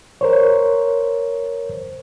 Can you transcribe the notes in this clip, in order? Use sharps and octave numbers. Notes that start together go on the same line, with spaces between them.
A#4 C5 C#5